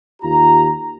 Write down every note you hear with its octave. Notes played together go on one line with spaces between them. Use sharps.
D#2 F4 G4 A#5